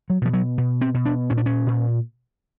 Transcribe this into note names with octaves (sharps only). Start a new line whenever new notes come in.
F#3
B2 F3
F#3
B2
C4
B2
D4
A#2 C#4
D4
C#4
A#2